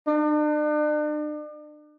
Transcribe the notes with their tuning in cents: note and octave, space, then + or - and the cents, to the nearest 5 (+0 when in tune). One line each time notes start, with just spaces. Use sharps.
D4 +40